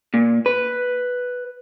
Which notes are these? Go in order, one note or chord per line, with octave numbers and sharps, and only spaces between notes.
A#2
B4